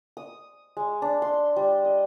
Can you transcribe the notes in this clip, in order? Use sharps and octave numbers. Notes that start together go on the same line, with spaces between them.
D#6
G#3
D4
C6
G3
D#5